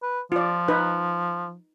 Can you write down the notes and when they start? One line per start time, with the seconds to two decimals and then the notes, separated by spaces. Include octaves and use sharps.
0.02 B4
0.32 F3 F4 D5
0.68 D#4 B4